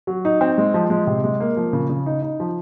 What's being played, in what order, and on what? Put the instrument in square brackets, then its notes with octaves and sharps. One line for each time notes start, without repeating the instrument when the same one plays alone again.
[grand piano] F#3
D#4
C4
G#3
F3
G#3
C3
G#3
A#3
F3
C#3
C#3
D#4
D#4
F3